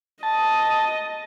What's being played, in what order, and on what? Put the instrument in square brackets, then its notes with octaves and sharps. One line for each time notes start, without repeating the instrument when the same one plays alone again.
[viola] D#5 [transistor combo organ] A5